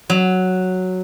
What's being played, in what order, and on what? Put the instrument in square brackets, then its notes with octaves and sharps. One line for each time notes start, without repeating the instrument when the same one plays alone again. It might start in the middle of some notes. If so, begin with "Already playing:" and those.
[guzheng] F#3